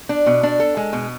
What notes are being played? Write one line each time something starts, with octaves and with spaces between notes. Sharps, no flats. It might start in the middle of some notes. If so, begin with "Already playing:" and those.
D4
B2
D4
A4
G#3
B2